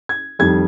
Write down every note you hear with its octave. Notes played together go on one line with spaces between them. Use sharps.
G#6
F2 D#3 G3 G#6